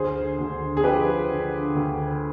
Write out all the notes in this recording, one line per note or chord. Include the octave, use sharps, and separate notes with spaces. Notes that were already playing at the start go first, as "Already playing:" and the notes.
Already playing: D2 G#4 C5
D2
G#4
F3 G4 B4
D3
D2